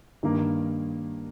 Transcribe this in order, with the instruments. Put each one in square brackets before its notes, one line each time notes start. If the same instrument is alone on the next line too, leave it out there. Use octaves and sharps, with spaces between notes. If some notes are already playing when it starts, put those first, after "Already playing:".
[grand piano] G2 D#3 A#3